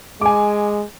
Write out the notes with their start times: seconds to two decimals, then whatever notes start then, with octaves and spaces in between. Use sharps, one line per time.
0.21 G#3 G#5 D6